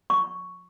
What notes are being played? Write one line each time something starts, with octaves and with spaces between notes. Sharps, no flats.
C#6